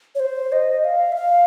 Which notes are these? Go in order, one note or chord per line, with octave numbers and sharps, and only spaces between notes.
C#5
C5
D#5
F5
E5
F5